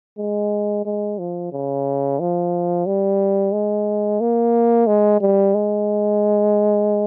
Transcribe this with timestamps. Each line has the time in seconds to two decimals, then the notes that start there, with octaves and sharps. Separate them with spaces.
0.18 G#3
0.85 G#3
1.18 F3
1.52 C#3
2.20 F3
2.86 G3
3.53 G#3
4.20 A#3
4.87 G#3
5.21 G3
5.55 G#3